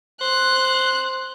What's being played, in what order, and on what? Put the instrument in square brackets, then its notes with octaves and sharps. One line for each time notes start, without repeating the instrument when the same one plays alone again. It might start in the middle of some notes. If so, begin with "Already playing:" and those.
[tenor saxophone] C5 [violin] F#6